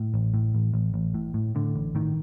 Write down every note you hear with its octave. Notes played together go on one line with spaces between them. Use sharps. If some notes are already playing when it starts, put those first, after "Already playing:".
Already playing: A2
A1
A2
A1
A1
A1
A2
A2
A2 D3
A1
A2 D#3